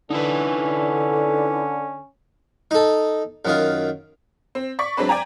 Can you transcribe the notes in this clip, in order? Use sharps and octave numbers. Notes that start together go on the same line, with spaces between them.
D3 C#4 D#4 E4 B4
D#4 A4
F#2 D#3 F4
C4
D5 C#6 B6
F#3 G#3 C4 D4 B4
D5 G5 G#5 A#5